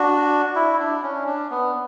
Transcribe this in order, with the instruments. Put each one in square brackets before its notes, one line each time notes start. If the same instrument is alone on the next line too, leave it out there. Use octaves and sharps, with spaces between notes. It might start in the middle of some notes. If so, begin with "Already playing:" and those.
Already playing: [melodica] D4 F#4
E4
D4
C#4
D4
B3